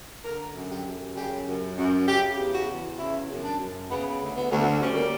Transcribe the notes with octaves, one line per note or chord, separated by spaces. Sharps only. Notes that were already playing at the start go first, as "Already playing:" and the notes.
D3 A#4
F#2
G4
F#2
C#3 G4
F#2
F#2
C#3 G4
E2
F#4
E2
C#3 E4
F#2
D4
F#2
C#3 B3
D2
B3
D2
G3 C#4
A#3